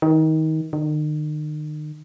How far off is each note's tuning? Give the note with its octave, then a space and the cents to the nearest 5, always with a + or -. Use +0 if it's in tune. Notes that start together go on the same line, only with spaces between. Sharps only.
D#3 +25
D#3 -40